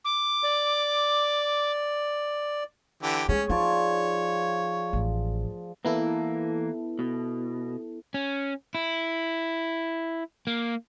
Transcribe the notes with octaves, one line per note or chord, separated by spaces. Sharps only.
D6
D5
D3 E3 G4
G#3 A#3 C#4 G#4 C#5 G#5
F3 D#4 F4 C#5 D5
A1
E3 A#3 B3 E4 A4
B2
C#4
E4
A#3